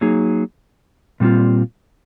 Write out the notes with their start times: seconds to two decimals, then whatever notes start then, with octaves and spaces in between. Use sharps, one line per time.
0.01 F#3 A#3 D#4 G#4
1.20 A#2 G3 C4 F4